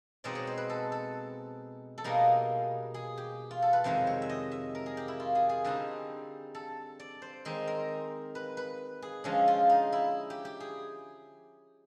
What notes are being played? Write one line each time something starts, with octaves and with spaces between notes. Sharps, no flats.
B2 G#3 C4 D#4 D5
C#5
C5
B4
A4
A4
A4
B2 G3 A#3 D#4 G#4
G#4
G4
F4
A4
B4
F2 C3 D#3 G#3 C5
C#5
E5
D#5
E5
A#4
G#4
G4
E4
F4
G#4
G#4
D3 G3 C4 D#4
A4
D5
C5
D#3 G#3 C4 D#4
A#4
B4
B4
G#4
D3 F3 G#3 C#4 G#4
F4
D#4
E4
G4
G4
G#4